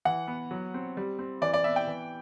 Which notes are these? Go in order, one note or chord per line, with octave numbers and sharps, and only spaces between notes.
E3 F#5
B3
F#3
C4
G3
C4
E3 D5
D5
B3 E5
G5
E3